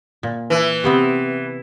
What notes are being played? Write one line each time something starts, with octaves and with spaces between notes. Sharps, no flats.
A#2
E3
C3 B3 C4